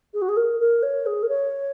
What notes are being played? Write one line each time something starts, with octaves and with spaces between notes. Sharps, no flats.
G#4
F#4
G#4
A#4
A#4
C#5
G#4
A#4
C#5